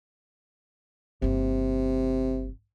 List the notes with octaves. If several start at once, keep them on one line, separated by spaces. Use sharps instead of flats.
G1 C3 A#3